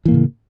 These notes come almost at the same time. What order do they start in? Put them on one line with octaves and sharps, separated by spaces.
E3 A#3 A2 C#3